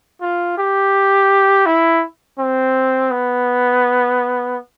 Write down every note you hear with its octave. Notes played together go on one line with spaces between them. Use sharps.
F4
G4
E4
C4
B3